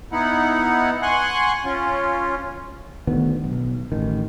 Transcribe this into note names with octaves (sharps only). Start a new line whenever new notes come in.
B3 D#4 E4 F#5
F#5 G#5 C6 C#6 F#6
C#4 F4
D2 D#3 B3
B1
A1 D#3